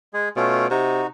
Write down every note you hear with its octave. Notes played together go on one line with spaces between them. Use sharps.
G#3 G#4
B2 A3 C#4 F4
C3 D#4 F#4